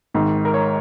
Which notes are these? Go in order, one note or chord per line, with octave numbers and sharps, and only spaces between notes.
G#1 G#2 D#3
A#4
C#5